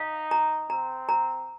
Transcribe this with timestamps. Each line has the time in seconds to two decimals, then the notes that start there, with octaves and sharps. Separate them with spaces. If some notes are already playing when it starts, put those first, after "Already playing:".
Already playing: D#4 F5
0.31 A#5
0.70 C4 A#5
1.09 A#5